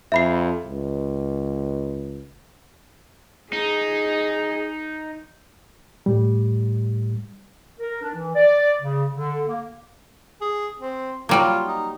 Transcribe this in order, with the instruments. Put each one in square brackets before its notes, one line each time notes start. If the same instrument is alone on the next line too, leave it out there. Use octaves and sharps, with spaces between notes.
[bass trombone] F2 [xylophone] E5 B5 C7
[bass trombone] C#2
[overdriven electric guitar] D#4 [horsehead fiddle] G#4
[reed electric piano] A2 G3
[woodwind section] A#4
D4
E3
D5
C#3
D3
A#3
[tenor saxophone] G#4
C4
[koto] F#3 G3 A#3 [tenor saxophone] F4
[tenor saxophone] D#4